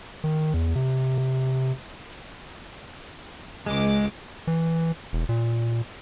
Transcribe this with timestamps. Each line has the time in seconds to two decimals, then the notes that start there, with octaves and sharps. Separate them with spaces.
0.24 D#3
0.54 E2
0.76 C3
1.18 C3
3.66 C#2 G#3 D6
4.47 E3
5.13 E1
5.29 A#2